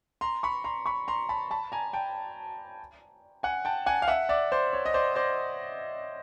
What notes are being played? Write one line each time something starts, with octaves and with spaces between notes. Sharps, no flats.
A#5 C6
B5 C#6
A#5 C6
B5 C#6
A#5 C6
A5 B5
A5 B5
G#5 A#5
G5 A5
F#5 G#5
G5 A5
F#5 G#5
F5
E5 F#5
D5 E5
C5 D5
C#5
D#5
C5 D5
C5 D5